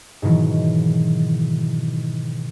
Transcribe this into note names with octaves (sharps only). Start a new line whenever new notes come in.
G#2 B2 D#3 E3 F#3